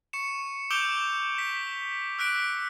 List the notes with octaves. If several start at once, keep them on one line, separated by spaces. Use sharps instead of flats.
C#6 C#7 E7
D6 E6 G6 D7 F7 G7
B6
E6 F#6 B6 D7